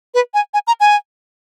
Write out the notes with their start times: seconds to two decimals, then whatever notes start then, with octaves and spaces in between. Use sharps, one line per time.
0.14 B4
0.34 G#5
0.54 G#5
0.67 A#5
0.80 G#5